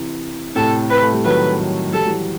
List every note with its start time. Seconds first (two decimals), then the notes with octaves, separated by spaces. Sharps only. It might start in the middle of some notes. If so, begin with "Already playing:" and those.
Already playing: C3 E3
0.55 A2 C3 A4
0.90 B4
1.02 A3
1.13 G3
1.24 D#3 F#3 B4
1.59 F#3 A3
1.93 G3 A4
2.00 F#3
2.07 E3 G3